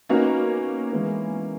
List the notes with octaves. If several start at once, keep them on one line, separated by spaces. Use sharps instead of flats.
A#3 B3 C#4 D#4 F#4 A#4
E3 G#3 B3 E4